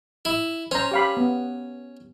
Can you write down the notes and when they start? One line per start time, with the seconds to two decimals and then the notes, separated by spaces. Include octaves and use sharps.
0.25 E4
0.71 C#4 C5 A#5
0.91 G4 F5 B5
1.17 B3